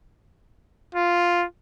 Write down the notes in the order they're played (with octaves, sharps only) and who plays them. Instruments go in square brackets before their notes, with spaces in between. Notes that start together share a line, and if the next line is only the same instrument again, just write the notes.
[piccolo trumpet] F4